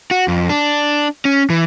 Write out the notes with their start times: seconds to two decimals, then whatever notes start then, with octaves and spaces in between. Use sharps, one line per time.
0.11 F#4
0.28 F2
0.49 D4
1.25 C#4
1.50 E3